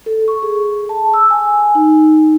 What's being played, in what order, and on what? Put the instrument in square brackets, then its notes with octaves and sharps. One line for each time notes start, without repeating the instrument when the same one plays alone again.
[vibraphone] A4
C#6
G#4
A5
E6
G#5
D#4